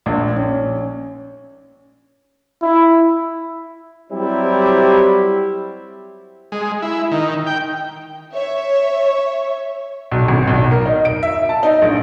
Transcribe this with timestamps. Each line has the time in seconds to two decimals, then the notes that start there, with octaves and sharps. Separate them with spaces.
0.06 A#1
0.36 C#4
2.62 E4
4.11 F#3 G3 C4 E4 G4
6.52 G#3
6.82 E4
7.11 D#3
7.47 G5
8.33 C#5 E5
10.11 B1
10.28 G#1
10.47 B1
10.71 A#4
10.86 D#4
11.05 D7
11.23 E5
11.49 A5
11.63 D#4
11.82 A#1